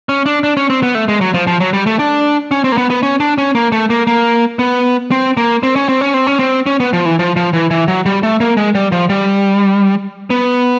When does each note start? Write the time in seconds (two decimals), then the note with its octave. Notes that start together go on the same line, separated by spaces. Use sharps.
0.09 C#4
0.26 D4
0.44 D4
0.57 C#4
0.70 C4
0.83 B3
0.95 A3
1.08 G#3
1.21 F#3
1.34 F3
1.47 F3
1.60 F#3
1.73 G3
1.86 A3
1.99 D4
2.51 C#4
2.64 C4
2.72 A#3
2.78 B3
2.90 B3
3.03 C#4
3.20 D4
3.38 C#4
3.55 A#3
3.72 A3
3.90 A#3
4.07 A#3
4.59 B3
5.11 C4
5.37 A#3
5.63 C4
5.76 C#4
5.89 C4
6.01 C#4
6.14 C4
6.27 C#4
6.39 C4
6.66 C#4
6.80 B3
6.93 F3
7.05 E3
7.19 F3
7.36 F3
7.53 E3
7.71 E3
7.88 F#3
8.06 G3
8.23 A3
8.40 A#3
8.57 G#3
8.75 G3
8.92 F3
9.09 G3
10.30 B3